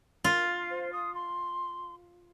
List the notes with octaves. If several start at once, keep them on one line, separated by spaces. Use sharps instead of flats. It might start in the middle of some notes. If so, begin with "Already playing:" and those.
F4 A#4
C5
D#6
C6